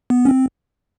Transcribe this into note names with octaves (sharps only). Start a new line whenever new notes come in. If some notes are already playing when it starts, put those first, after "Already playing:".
B3
C#4
C4